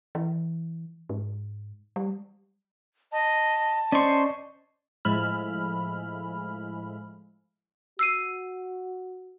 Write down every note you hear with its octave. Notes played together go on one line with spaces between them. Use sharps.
E3
G#2
G3
D#5 A5
C#4 C5 D5 D#5 C#6
A2 F3 G#3 E4 B5 F6
F#4 E6 C7 D#7